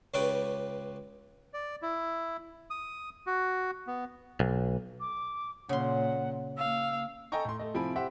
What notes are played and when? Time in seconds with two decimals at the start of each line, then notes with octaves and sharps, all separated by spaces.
0.14 C#2 C#3 C#4 G4 B4 D5
1.54 D5
1.82 E4
2.70 D#6
3.27 F#4
3.87 B3
4.40 B1
5.00 D6
5.69 A#2 C#3 F#5 C6
6.58 A#3 F5 E6
7.32 A4 D#5 G5 G#5 A#5 C#6
7.45 A2 C6
7.59 A3 D#5
7.74 C3 F3 E4 G#5 B5 D7
7.96 G4 C5 E5 F#5